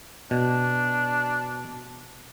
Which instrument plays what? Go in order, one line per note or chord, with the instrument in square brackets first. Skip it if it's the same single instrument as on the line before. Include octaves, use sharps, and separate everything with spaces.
[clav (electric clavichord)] B2 [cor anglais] D4